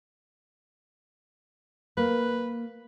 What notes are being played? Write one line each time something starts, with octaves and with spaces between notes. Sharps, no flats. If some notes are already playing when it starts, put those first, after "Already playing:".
A#3 B4